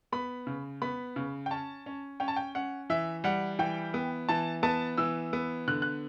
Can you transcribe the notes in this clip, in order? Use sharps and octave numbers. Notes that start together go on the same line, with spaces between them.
B3 B5
C#3
B3 B5
C#3
G5
C#4 A5
C#4
C#4 G5
A5
G5
C#4 F#5
E3 E5
G3 F#5
E3 G5
B3
E3 A5
B3 A5
E3 E6
B3
D3 F#6
F#6